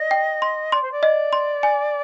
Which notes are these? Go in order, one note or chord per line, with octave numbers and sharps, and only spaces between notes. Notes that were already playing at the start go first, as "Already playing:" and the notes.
Already playing: D5 D#5
G5
C6
D5 C6
C5
D5
D#5
C6
G#5